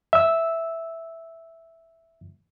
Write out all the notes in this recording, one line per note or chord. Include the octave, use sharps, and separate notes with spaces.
E5 E6